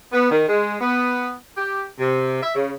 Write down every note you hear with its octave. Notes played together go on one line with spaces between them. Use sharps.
B3
D#3
G#3
B3
G4
C3
E5
C#3